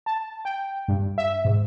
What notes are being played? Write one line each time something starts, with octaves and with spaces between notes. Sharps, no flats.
A5
G5
G2
E5
G#2